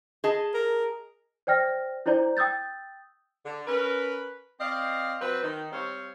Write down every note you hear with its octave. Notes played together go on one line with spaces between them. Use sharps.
G#4 D#5 A5
A#4
C5 D5 G5 F6 A#6
D4 E4 C5 D5 A#5 G6
G5 D#6 E6 G6 A6
D3
C#4 A#4 B4
C4 D5 D#5 F5
F#3 C4 B4
D#3 D#4
G3 C4 C5 C#5 F5